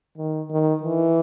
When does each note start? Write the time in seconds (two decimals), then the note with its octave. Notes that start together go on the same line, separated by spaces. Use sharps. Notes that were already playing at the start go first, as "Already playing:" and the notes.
0.18 D#3
0.50 D#3
0.83 E3